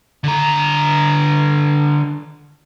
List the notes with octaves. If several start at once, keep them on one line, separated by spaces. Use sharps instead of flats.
D3 A#5